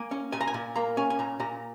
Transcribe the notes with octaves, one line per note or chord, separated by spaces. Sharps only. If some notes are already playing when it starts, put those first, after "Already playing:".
Already playing: A#3 G#5
C#4
A#2 G#5
A#5
G#5
A#2
A#3 A#5
C#4 G#5
G#5
A#2 A#5
A#2 A#5